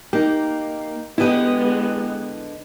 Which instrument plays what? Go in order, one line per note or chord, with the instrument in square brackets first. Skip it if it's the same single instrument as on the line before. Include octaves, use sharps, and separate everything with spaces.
[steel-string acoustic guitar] A#3 [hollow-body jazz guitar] D#4 G4
[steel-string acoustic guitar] D3 B4 D#5 [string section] G#3 B3 [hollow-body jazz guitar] E4 G4